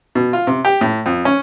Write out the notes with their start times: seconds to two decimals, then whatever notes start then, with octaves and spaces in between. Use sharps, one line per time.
0.15 B2
0.33 F4
0.47 C3
0.65 G4
0.81 A2
1.06 F2
1.25 C#4